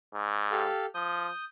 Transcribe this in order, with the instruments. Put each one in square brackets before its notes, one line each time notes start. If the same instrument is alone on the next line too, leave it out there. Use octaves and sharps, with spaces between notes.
[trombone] G#2
[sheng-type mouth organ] G4 A4 F5
[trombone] F3 [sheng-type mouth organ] D#6 G6